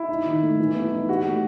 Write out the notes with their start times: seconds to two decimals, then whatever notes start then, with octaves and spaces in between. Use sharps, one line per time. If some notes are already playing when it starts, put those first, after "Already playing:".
Already playing: E4
0.08 D#4
0.26 D#3
0.42 A3
0.60 E3
0.75 B3
0.92 D#4
1.09 F#4 G4
1.26 A3